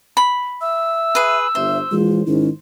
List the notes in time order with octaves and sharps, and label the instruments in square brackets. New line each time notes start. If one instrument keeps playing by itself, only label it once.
[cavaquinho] B5
[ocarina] E5 [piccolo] E6
[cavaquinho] G#4 B4
[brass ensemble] G1 [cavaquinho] C5 [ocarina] E5
[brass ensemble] A#1 E3 G#3 [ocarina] F4
[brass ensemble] G#2 D#3 E4 [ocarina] C#4